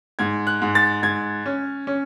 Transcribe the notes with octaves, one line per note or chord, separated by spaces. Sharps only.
G#2 G#6
F#6
G#2
A6
G#2 G#6
C#4
C#4